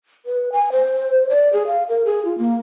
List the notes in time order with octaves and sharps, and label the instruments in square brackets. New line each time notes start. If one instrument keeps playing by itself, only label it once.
[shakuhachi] B4
G#5
C5
D5
G#4
F5
A#4
G#4
F4
A#3